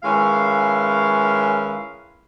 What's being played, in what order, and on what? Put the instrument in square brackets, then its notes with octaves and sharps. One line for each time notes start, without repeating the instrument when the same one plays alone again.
[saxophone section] D#3 G#3 C#4 E4 B4 F5